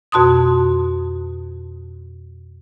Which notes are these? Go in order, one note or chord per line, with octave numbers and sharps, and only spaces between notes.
F2 B2 F#4 A5 C6 D#6